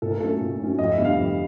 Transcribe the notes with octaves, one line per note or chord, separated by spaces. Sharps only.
A#2 A4
A#4
F#3 A3 C#4 A4
A#2
F#3 A3 C#4
F2 D#5
E5
D3 G3 B3
F5
F2